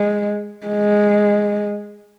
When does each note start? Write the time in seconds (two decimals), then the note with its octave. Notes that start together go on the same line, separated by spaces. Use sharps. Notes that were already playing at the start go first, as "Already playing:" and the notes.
Already playing: G#3
0.67 G#3